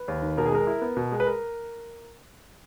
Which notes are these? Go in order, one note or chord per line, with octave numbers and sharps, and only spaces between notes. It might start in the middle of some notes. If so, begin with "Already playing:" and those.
Already playing: B4
D#2
D#3
B2 A#4
G#4
G#3 A#4
E4
B3
B2
G#3
B4
A#4